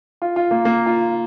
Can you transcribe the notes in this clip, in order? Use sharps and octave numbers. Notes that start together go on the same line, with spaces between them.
F4
F4
A#3
A#3
F4